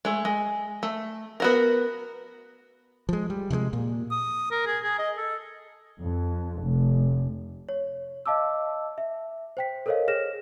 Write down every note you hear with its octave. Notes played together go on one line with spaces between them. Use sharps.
G#3 A3
G#3
A3
B3 F#4 A#4
F3 G#3
G3
C3 F3 F#3 G#3
A#2
D#6
A#4
G#4
G#4
D#5
A4
F2
F1
C#5
D#5 F5 A5 D6 E6
E5
C5 G5 B6
A4 A#4 C5 C#5 D#5 F5
G#4 C#5 F6 A#6 E7